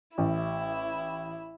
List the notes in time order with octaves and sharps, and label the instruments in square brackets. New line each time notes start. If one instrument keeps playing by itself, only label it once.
[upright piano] A1 [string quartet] E4